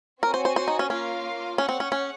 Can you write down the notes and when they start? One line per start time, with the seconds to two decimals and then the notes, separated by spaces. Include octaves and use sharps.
0.23 C4 F#4 A#4 C#5 G#5
0.34 C5
0.45 C5
0.56 C5
0.68 D#4
0.79 C#4
0.90 A#3 C#4 F4 A#4 F5
1.58 C#4 G#4 C#5 F#5
1.69 C4
1.80 C#4
1.92 C#4